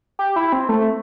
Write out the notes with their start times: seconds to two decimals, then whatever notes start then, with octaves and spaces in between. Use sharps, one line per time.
0.19 G4
0.36 E4
0.53 C4
0.69 A3